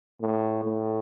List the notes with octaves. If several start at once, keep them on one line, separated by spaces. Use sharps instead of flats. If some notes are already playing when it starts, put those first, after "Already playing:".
A2
A2